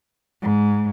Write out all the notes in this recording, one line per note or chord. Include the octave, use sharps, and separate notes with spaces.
G#2